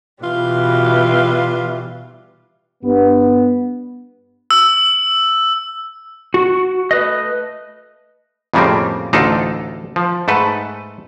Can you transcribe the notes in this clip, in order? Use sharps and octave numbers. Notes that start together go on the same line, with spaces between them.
B2 E3 G3 F4
G2 B3
E6
F#4
A3 B4 D#5
F2 A2 C#3 G3 A#3 C4
A1 D2 D4 D#4 F4 A4
F3
G#2 A3 A4 B4